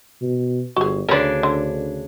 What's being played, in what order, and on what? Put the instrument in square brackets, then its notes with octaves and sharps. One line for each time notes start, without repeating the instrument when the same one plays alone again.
[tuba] B2
[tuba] G1 [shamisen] F#4 G#4
[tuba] D2 [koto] C#3 D4 [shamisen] A#4 B4
[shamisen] D3